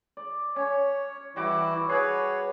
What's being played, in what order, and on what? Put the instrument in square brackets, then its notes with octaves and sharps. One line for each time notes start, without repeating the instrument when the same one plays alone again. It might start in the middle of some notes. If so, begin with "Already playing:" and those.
[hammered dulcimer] D5
[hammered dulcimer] C#4 [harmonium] C#5
[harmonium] E3 E4 [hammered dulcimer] G3 F#4 D6
[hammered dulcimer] G#4 F#5 [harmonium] B4 C#5